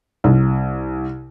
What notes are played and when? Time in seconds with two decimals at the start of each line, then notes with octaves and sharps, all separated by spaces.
0.24 C2